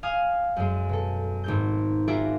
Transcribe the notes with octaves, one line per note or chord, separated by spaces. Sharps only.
D#5 F5 G#5 D#6 F6
F#2 G#3
B2 A4
G#1 G#2 G6
F4 F#4 G#4 A#4 D5 E5